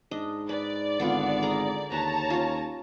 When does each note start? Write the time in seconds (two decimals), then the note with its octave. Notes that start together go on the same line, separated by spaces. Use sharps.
0.11 G#2 D4 D#5
0.49 B4 D5
1.00 G#1 D3 B3 F4
1.43 G#4 A#4 A#5
1.92 D#2 B4 C#5 A5 A#5
2.30 C#4 F4